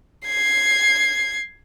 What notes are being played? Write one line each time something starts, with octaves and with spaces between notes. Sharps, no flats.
G#6 C7